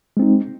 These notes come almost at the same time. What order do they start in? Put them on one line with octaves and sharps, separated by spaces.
G#3 C4 D#4